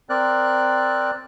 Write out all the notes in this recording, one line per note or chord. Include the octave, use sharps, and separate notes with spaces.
C4 A#4 D5 F#6